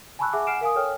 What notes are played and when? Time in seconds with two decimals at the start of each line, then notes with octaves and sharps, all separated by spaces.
0.19 G#5 A5 B5 C#6 E6 F#6
0.33 G#4 E5 F#5 G#5 D6
0.47 F#5 G#5 F6 C7 D7 E7
0.61 A#4 F5 G#5 D#6
0.76 A4 C#5 G5 F6